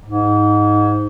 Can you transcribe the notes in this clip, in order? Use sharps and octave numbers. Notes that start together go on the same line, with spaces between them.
G#2